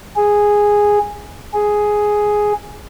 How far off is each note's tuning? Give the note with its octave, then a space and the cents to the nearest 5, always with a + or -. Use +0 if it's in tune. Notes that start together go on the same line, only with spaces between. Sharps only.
G#4 -5
G#4 +5